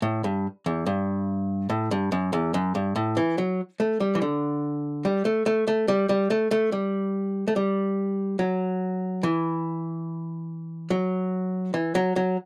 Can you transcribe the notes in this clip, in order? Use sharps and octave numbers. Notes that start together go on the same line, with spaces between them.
A2
G2
E2
G2
A2
G2
F#2
E2
F#2
G2
A2
E3
F#3
A3
G3
E3
D3
G3
A3
A3
A3
G3
G3
A3
A3
G3
A3
G3
F#3
E3
F#3
E3
F#3
F#3